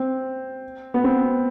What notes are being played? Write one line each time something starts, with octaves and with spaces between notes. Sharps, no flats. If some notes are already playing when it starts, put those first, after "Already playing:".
Already playing: C4
B3
C4